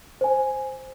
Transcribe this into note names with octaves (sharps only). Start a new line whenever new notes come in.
C5 G#5